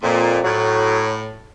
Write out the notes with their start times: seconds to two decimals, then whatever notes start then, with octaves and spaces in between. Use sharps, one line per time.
0.03 F2 A#2
0.44 A2 F#3